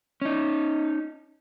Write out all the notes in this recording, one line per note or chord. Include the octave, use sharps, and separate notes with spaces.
C#4 D#4